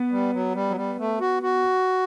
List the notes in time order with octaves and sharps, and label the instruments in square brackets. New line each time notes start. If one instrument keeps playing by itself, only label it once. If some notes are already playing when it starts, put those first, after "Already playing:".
Already playing: [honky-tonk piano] B3
[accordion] G3
F#3
G3
F#3
G3
A3
F#4
F#4